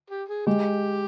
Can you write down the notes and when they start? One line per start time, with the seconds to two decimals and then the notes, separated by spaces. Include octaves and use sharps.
0.10 G4
0.28 G#4
0.46 G#3 G4